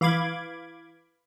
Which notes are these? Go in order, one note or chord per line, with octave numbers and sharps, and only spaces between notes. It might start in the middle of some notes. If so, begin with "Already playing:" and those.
E3 F5 B5 D6 G#6